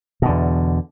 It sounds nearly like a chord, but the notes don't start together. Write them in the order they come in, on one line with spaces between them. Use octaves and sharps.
B2 D3 E2